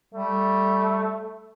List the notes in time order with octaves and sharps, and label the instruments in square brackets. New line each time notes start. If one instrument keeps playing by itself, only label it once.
[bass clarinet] G3 [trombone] A3